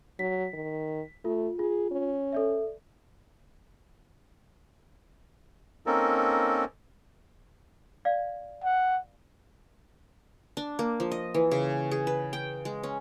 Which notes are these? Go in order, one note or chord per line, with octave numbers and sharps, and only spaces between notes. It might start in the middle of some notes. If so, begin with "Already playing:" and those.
F#3 B6
D#3
A3 F4
F4 G#4
C#4
A4 D5 E5
A#3 C4 C#4 D#4 A4 A#4
D5 F5
F#5
D4
A#3
F3
D#5
E3
C#3
G#4
B4
G5
G#3
C#4